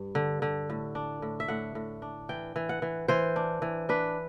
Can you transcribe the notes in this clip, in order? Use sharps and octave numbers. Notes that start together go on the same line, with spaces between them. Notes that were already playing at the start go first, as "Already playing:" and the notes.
Already playing: G2
D3
D3
A2
D4
A2
E5
A2 F#5
A2
D4
E3 G5
E3
F#5
E3
E3 C5
D4
E3
D4 B4